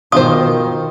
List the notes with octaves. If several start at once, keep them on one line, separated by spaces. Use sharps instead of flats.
B2 D#3 F4 C5 D#6